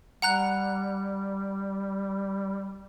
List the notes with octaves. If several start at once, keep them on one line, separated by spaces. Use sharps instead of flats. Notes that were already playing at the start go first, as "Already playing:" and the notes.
G3 F#5 A#5 F#6